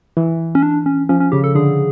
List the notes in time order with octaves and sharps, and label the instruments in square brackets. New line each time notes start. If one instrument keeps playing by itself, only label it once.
[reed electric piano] E3
[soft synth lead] C#4
D4
C#4
[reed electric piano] F3 [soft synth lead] C#4
[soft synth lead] C#4
[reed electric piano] C#3 [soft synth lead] G4
[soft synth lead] A4
[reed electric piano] D3 [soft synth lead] G#4